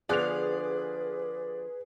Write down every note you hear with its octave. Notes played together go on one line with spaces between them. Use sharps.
D3 F3 B3 G#4 B4 D5 F#6 F7